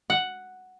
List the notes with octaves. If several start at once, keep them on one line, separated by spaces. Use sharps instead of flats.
F#5